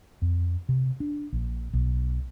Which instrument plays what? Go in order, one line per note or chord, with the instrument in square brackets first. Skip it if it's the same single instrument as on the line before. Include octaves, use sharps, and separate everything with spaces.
[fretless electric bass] F2
C3
D4
A#1
B1